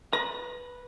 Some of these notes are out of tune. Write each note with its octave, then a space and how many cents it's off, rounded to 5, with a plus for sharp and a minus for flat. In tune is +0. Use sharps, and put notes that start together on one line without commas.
B4 -5 A#5 +20